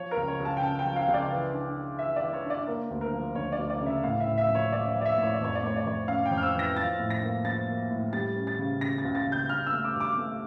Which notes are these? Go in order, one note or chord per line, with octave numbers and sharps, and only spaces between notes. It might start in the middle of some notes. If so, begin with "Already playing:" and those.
Already playing: F3 C#5
A#4
C#2
C#5
C#2
A5
G5
C#3 A5
G5
F3
F5
C#2
D5
E3
D4
D4
E3 E5
D5
E3
C#5
D4
D5
A#3 A#4
D2
A#4
F3
D2 C#5
D5
D2
D5
C#3
E5
A2 F5
E5
A2
E5
F3
C#5
F3 D5
D5
F3
D5
E5
A2
C#5
D5
F2 C#5
D5
A3 C#5
D5
F2 C#5
C#4 F5
G5
F2
F6
E6
E3
A#6
F3 A6
A2
A#6
A#3
F3 A6
A#3
A2
G3 A6
C#4
A6
C#3
C#3 A#6
A6
C#2
A6
C#2
G6
G2 F6
E6
A3
D6
G2
D6
A3